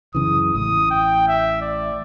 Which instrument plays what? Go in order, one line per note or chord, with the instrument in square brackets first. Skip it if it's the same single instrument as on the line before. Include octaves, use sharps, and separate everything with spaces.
[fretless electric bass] F#2 C#3 E3 [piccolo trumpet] D#6
[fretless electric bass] A1 A2 [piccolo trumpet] D#6
[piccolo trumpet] G5
E5
D5